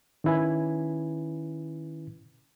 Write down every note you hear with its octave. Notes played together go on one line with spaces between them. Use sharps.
D#3 C#4 E4 B4 G#5